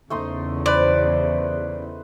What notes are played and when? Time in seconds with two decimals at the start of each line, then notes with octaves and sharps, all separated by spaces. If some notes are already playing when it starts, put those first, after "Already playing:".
0.10 E2 C#3 A3 D#4 C6
0.66 B4 C5 D5